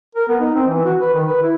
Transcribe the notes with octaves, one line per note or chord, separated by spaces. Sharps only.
A#4
B3
D#4
C4
E3
F#4
B4
D#3
B4
E4